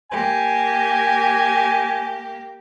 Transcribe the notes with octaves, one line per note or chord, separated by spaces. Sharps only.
A#3 G4 G#5